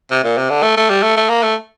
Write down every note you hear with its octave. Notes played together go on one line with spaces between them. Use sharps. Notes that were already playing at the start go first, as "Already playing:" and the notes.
C3
A#2
C3
D3
A3
A3
G3
A3
A3
A#3
A3